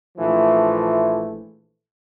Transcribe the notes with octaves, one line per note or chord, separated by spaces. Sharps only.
A#1 E3 F3 A3